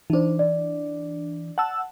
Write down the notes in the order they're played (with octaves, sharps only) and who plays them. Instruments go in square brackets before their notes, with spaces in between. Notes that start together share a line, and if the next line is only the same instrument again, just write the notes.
[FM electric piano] E3 D4 [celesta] D#4 C5
[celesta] D5
[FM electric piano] F#5 A5 E6